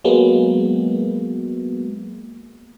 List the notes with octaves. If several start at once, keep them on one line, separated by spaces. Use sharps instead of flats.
F#3 G#3 A#3 B3